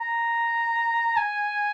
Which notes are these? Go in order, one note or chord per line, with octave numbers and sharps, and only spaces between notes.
A#5
G#5